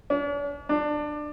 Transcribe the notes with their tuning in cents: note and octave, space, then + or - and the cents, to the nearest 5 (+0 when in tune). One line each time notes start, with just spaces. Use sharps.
D4 -45
D4 +20